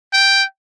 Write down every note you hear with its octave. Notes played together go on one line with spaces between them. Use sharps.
G5